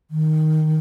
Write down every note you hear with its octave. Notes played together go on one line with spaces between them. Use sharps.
D#3